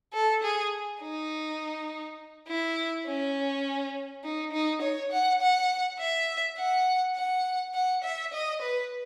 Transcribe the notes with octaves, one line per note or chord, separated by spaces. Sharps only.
A4
G#4
D#4
E4
C#4
D#4
D#4
C#5
F#5
F#5
E5
F#5
F#5
F#5
E5
D#5
B4